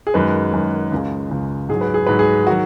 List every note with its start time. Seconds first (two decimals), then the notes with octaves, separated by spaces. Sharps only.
0.07 G#4
0.14 F#2 D#3 G#3 B4
0.53 F#2 D#3 G#3
0.92 C#2 C#3 G#3
1.31 C#2 C#3 G#3
1.69 G#2 F#3 G#4
1.81 B4
1.94 G#4
2.07 G#2 F#3 B4
2.19 G#4
2.47 D#3 F#3 F#4